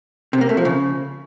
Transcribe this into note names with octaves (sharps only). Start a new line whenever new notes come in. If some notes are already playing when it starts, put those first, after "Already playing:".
C3
A#3
A3
F3
C#3